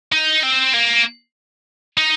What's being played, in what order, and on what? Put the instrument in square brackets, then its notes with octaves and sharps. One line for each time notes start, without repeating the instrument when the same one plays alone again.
[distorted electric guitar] D#4
C4
A#3
D#4